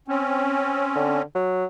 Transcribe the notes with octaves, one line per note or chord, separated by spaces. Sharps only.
C4 C#4
D3
F#3